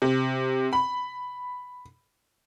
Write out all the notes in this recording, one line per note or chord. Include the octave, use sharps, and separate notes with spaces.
C3
B5